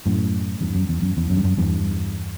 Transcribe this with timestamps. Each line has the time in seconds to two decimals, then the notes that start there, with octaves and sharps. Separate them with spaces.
0.06 F#2 A2
0.61 E2 G2
0.75 F#2
0.89 E2
1.02 F#2
1.17 E2
1.30 F#2
1.37 G2
1.44 F#2
1.58 E2 G2